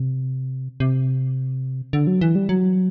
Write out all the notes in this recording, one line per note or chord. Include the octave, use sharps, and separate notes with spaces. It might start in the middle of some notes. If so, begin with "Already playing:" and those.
Already playing: C3
C3
D3
F#3
E3
G3
F#3